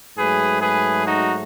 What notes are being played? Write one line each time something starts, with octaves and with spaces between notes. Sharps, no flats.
G#2 F#3 A3 G#4 B4
G#4 B4
D#4 F#4